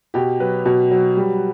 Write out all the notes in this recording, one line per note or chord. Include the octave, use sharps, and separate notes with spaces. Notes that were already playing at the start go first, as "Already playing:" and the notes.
B2 G4
F#3 B4
B2
F#3
G3